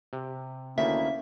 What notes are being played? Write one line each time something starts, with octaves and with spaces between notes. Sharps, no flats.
C3
D2 D#3 A#3 C#4 E4 E5